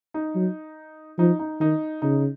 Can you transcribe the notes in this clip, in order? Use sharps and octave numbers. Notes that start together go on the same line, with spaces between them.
D#4
F#3
F3 D#4
D#4
D#3 D#4
C#3 D#4